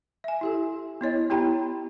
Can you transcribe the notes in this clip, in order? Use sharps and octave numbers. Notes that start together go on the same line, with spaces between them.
E5 G#5
E4 G4 A4
B3 E4 C#5 D#5
B3 E4 G4 G5 A#5 B5